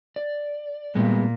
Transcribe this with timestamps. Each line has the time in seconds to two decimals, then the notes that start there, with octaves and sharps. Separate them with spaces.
0.16 D5
0.95 A#2 G3 G#3 B3